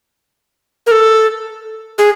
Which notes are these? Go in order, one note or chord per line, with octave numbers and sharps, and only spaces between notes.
A#4
A4
G#4